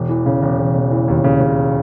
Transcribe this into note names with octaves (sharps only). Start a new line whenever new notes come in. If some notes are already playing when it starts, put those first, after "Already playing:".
Already playing: E1
E3
C#3
E1
E1
E1
E3
D#2
C#3
C#3